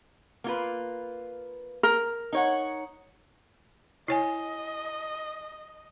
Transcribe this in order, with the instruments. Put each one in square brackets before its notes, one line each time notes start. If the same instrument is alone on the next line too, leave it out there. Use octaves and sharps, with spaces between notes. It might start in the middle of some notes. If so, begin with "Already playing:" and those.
[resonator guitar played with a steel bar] A#3 F4 B4
[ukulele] A#4
[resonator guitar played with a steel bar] D#4 C#5 F#5
[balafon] E4 C#5 G#5 [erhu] D#5